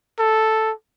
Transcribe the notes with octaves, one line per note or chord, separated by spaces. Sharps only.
A4